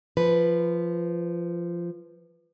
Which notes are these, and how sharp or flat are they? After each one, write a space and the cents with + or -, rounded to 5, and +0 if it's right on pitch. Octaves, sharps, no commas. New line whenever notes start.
F3 -15 B4 +0